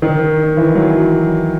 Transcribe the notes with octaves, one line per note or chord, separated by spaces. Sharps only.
D#3
E3
F#3